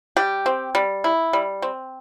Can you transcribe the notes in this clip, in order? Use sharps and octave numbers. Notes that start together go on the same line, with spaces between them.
G3 G4
C4
G3
E4
G3
C4